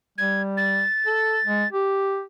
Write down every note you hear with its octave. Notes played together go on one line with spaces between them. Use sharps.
G3 G#6
A6
A4
G#3
G4